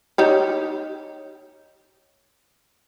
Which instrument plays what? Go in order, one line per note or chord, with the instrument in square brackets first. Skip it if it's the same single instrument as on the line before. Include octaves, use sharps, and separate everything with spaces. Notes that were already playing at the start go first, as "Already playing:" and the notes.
[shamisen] D#4 G4 C#5